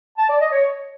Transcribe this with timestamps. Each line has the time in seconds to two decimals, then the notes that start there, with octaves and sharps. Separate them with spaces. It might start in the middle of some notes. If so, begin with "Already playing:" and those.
0.18 A5
0.29 D5
0.40 D#5
0.51 C#5